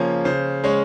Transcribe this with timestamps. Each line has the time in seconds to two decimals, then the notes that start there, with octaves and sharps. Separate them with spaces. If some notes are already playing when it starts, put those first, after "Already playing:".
Already playing: C#3 F3 A#3 C#4
0.25 C#3 C5
0.64 G#3 C#4 C#5